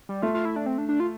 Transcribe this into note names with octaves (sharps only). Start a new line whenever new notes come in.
G3
A3 F4
F4
E4
D4
C4
D4
D4
F4